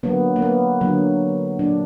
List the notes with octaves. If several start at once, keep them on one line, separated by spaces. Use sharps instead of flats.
D3 F#3 A#3 B3
A#3
B3
D3 F#3 A#3
A#2 F#3 A#3 D4